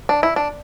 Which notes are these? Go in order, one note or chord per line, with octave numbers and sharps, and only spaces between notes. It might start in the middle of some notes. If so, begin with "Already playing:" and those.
D4
E4
D4